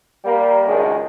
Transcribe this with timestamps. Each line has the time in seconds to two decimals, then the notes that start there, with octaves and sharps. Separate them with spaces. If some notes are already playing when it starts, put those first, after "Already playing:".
0.25 G3 A#3
0.67 C#2 F#2 A#2 D#3 D4 G#4